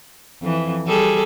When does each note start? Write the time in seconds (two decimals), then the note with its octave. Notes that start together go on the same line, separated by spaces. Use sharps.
0.42 F2 E3
0.87 G3 G#4 A4